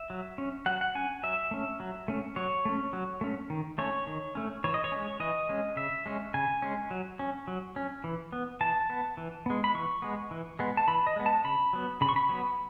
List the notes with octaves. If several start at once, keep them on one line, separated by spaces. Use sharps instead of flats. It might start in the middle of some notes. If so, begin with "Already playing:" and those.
Already playing: E5
F#3
C#4
F#3 F#5
F#5
C#4 G#5
F#3 E5
A3 C#4
F#3
A3 C#4
F#3 C#5
A3 C#4
F#3
A3 C#4
D#3
A3 C#4 C#5
D#3
A3 C#4
E3 C#5
D#5
C#5
G#3 C#4
E3 D#5
G#3 C#4
C#3 E5
G#3 C#4
C#3 G#5
G#3 C#4
F#3
C#4
F#3
C#4
E3
B3
E3 A5
B3
E3
G#3 B3
B5
E3 C#6
G#3 B3
E3
G#3 B3
A5
E3 B5
D#5
G#3 B3
A5
C#3 B5
F#3 B3
C#3 B5
C#6
B5
F#3 B3